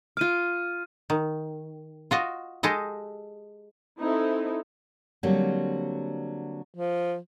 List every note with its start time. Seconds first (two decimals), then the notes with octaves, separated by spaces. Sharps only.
0.17 F4 D6 F6 D#7
1.10 D#3
2.11 F4 F#4 D#5
2.63 G#3 G4 A4 D#5
4.00 C4 D#4 E4 A4
5.23 D3 F#3 G3 A#3 C4
6.76 F3